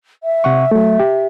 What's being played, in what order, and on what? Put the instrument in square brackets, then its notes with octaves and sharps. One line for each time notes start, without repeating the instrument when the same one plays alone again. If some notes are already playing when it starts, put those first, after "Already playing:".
[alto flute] E5
[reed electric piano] C3 F#5 C#6
F#3 A3
G4